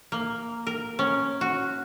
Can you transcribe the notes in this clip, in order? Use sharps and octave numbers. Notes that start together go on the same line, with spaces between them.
A#3
A#4
C#4
F#4